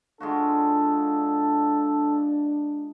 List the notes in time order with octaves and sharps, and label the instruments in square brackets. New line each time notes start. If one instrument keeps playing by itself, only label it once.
[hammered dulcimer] G#3 F4 F#4 [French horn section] D4 [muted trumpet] A4